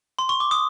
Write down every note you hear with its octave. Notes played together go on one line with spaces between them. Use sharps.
C6
C#6
D6
D#6